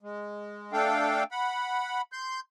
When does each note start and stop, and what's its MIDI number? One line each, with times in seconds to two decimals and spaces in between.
0.02 0.73 56
0.73 1.24 57
0.73 1.24 62
0.73 1.24 69
0.73 1.24 77
0.73 1.24 79
1.31 2.01 78
1.31 2.01 83
2.12 2.40 84
2.12 2.40 91